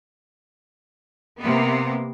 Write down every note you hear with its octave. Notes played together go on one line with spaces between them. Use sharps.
C3 A#3 B3